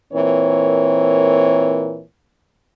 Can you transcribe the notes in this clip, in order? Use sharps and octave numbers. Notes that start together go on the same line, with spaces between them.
A#2 E3 C4 A#4 C#5